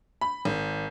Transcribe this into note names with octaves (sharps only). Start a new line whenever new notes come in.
B5
G#1